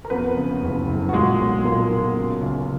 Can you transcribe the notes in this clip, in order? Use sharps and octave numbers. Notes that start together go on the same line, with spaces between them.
A#4
F2 B3 B4
C#3
F#1
F#1
F#4
A#2 G#3 G#4
B1
A#2 A#3
B1
C#3
C#2